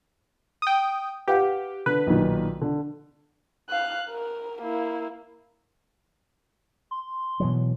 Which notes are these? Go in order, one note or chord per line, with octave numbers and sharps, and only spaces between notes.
G5 D#6
G4 B4 F5 F#5
D3 B4
B1 A#2 D#3
D3
F5 F#6
A#4
A#3 E4
C6
B2 E3 F#3